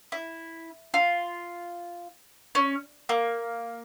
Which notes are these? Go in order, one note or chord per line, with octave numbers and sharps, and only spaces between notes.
E4
F4
C#4
A#3